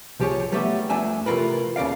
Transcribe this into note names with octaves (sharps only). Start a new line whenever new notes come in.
C2 F3 G4 G#4 C#5
F#3 G3 A3 B3 G4 E5
F2 F3 A3 D4 E5 G#5
C3 E3 A3 F4 A#4 B4
D#2 C#3 A3 D5 F5